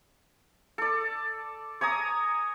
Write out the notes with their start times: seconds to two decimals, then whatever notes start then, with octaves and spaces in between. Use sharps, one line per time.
0.78 A4 D5
1.81 C#5 G#5 A#5 D#6